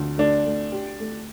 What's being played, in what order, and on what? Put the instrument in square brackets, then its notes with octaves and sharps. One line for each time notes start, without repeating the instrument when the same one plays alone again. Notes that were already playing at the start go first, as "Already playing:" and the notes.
Already playing: [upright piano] D2
[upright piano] A3 [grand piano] D4
[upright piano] A3
G4
A3